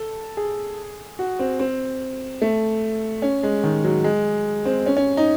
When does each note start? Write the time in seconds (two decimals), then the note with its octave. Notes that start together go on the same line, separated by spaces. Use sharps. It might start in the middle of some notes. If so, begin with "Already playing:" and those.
Already playing: A4
0.37 G#4
1.19 F#4
1.39 C4
1.59 C4
2.42 A3
3.22 C#4
3.43 G#3
3.63 D#3
3.84 F#3
4.04 G#3
4.65 C4
4.86 C#4
4.97 C#4
5.17 D#4